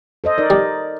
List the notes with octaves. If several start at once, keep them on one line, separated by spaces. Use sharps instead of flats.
A4 C5 D#5
D#4 A#4 D5
G3